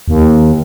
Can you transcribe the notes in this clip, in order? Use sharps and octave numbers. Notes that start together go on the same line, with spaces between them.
D#2